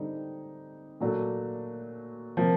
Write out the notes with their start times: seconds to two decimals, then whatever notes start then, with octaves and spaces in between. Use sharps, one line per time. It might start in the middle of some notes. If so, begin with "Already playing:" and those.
Already playing: D3 G3 C4 D#4
1.01 A#2 F#3 A3 D4 F#4
2.37 C3 F3 A#3